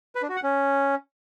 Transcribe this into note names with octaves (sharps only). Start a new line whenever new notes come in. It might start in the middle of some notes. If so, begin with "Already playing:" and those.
B4
D4
F#4
F#5
C#4